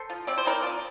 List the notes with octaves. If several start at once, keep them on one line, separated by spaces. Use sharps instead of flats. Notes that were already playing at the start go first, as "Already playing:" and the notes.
Already playing: A4 C5
F3
C4 D5
C5
C4 A#4 D5
F3